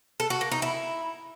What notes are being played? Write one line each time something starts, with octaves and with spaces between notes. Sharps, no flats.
A4
F#4
A#3
D#4
E4